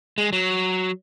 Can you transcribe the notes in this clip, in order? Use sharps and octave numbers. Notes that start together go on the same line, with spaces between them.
G#3
F#3